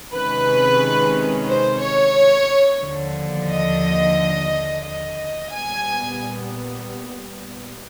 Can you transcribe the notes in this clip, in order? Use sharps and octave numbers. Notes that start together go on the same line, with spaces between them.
C3 D#3 G#3 C#4 B4
C5
C#5
D#2 D3 F3
D#5
D#5
A#2 G3 B3 G#5